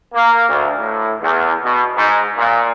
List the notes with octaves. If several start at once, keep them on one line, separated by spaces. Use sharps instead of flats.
A#3
D2
A2
E2
B2
G#2
A#2